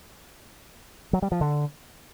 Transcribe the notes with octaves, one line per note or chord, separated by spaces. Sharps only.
F#3
G3
F3
D3